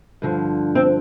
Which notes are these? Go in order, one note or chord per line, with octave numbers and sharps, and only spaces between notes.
G2 D3 F3
C4